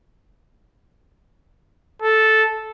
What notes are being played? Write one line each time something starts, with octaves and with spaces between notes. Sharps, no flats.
A4